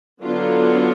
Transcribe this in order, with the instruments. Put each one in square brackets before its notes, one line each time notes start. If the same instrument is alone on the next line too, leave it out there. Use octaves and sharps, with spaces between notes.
[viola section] D3 F#3 B3 D4 F4